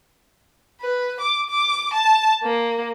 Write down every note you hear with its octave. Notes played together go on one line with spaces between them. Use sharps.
B4
D6
D6
A5
A#3